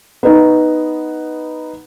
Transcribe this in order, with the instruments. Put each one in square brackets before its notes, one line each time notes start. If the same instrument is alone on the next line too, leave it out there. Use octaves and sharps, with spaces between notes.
[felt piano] B3 D#4